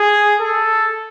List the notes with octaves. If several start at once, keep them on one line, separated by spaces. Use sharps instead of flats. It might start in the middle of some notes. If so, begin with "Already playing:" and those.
Already playing: G#4
A4